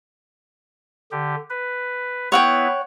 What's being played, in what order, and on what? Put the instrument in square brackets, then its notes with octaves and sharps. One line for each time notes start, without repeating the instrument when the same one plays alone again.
[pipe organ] D3 G4
B4
[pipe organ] B3 E4 [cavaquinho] C#5 F#5 G5